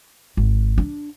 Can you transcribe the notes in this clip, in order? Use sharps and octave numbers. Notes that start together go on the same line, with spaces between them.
G#1
D4